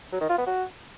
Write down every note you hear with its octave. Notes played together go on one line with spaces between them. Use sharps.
F#3
D#3
F4
B3
F#4